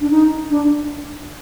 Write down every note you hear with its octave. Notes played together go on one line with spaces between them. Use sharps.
D4
D#4
D4